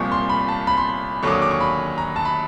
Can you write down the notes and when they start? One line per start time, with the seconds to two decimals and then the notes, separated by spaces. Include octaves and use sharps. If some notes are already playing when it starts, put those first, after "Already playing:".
Already playing: C2 A#2 F3 C#6
0.12 C6
0.30 B5
0.48 A5
0.67 B5
0.77 C6
1.23 D#2 D3 F#3 C#6 D6
1.32 D#6
1.42 D6
1.51 C#6
1.61 B5
1.98 A#5
2.16 A5
2.25 B5